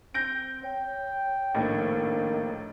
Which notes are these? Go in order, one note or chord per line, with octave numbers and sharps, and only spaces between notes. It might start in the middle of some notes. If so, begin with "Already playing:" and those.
C4 G6 A#6 D7
C#5 G5
A#1 A2 D#3 A#3